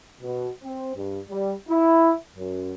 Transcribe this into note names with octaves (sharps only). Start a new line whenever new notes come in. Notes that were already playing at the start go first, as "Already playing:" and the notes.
B2
C4
G2
G3
E4
F#2